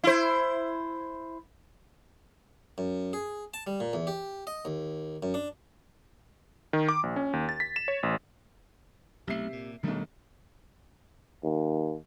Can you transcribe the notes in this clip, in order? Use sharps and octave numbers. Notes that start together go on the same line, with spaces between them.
E4 C5
F#2
G#4
A5
G3
A#2
E2
G4
D#5
D#2
F#2
D4
D#3
D6
A#1
C#4
D#2
A6
B6
E7
C#5
A1
B1 C3 A3 E5 C7
A#2
E1 B1 D#3 G3 A3
D#2